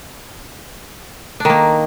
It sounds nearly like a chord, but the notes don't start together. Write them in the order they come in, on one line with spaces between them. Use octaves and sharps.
D4 D#3 A#3